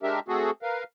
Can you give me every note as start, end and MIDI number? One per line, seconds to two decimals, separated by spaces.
0.03 0.20 56
0.03 0.20 62
0.03 0.20 67
0.03 0.20 70
0.03 0.20 76
0.28 0.51 57
0.28 0.51 60
0.28 0.51 66
0.28 0.51 68
0.28 0.51 69
0.62 0.84 70
0.62 0.84 71
0.62 0.84 77